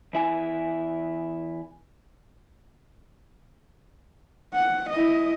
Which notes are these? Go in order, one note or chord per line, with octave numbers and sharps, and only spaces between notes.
E2 E4 G#5
F#5
E4 D#5